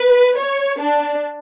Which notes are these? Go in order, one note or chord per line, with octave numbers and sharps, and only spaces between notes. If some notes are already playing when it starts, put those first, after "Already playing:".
Already playing: B4
C#5
D4